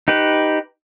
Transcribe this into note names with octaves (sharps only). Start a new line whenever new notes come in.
D#4 G4 B4